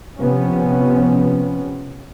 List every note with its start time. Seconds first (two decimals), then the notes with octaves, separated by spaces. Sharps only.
0.19 C3 F3 B3 C#4